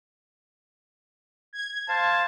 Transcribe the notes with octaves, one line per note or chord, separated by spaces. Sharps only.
G#6
C5 F5 A5